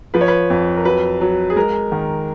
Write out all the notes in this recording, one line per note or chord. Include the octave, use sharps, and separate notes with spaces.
F3 B4
C#5
B4
F2
A#4
F#3 B4
F#3
G#4
G#3 A#4
D#3